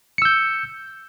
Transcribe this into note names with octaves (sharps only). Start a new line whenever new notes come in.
E6 G6 C#7